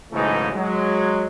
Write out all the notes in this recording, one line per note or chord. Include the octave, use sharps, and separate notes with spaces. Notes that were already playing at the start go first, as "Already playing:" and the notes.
B1 G#2 C#3 E3 A3 D#4
F#3 G#3